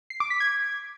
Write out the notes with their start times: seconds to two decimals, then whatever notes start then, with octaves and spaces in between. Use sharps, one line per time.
0.10 C7
0.20 D6
0.30 B6
0.40 G#6